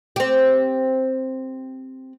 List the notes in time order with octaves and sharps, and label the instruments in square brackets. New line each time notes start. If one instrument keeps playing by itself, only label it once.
[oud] C4 G4